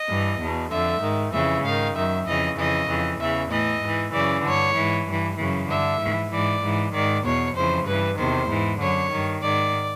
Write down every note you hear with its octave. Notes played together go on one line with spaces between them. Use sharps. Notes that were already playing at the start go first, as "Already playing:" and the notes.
Already playing: D#5
G2 E3
E2 B2
F2 D3 E5
G#2 D#3
F2 C#3 E3 E5
G#2 D#3 F5
F#2 D#3 E5
F2 C#3 E3 D#5
F2 C#3 E3 D#5
F2 C#3 E3
E2 C#3 E3 E5
A2 E3 D#5
G#2 E3
F#2 C#3 E3 D5
G2 D3 C#5
G#2 E3
G2 E3
F#2 C#3 E3
G2 D3 E5
G#2 E3
G#2 E3 D5
G#2 E3
G#2 D#3 D5
E2 B2 C#5
F2 C#3 E3 C5
G2 E3 B4
E2 C3 D#3 C5
G#2 E3
F#2 D3 C#5
G2 D#3
G#2 D#3 D5